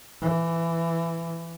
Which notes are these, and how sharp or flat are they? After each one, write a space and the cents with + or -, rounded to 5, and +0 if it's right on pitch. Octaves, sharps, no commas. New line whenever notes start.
E3 +15